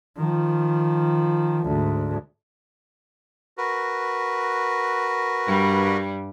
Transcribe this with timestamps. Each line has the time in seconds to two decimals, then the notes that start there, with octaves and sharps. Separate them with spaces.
0.18 D#3 F3
1.67 D2 G#2
3.58 F#4 A#4 B4
5.46 G2 G3